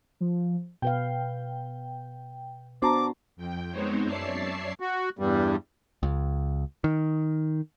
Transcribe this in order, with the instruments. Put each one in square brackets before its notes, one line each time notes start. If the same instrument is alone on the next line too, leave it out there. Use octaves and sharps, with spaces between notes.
[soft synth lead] F3
[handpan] B2 B4 F5 [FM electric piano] G5
[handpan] B3 D4 F#4 [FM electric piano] C5 A5 A#5 [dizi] D6
[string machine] F2 G5
G#3 B3 C4 D#4 C5 C#5
F#2 C#5 D5 E5 A5 C7
[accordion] F#4
E2 G2 G3
[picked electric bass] C#2
D#3